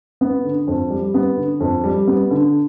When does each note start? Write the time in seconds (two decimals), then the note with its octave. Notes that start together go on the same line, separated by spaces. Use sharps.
0.21 B3
0.44 D3
0.68 F2
0.90 G3
1.14 B3
1.37 D3
1.60 F2
1.84 G3
2.07 B3
2.31 D3